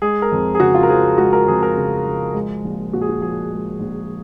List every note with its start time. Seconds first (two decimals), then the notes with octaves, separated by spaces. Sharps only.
0.02 G#3 G#4
0.22 A#4
0.32 F2
0.55 G#4
0.60 C#3 F#4
0.75 F4
0.83 A#4
0.89 F3 G#4
1.18 G#3 F#4
1.33 A#4
1.47 F2 G#4
1.63 A#4
1.77 C#3
2.06 F3
2.34 G#3
2.64 A#1
2.93 A#2 F#4
3.01 G#4
3.09 F#4
3.21 F3 G#4
3.51 G#3
3.80 A#1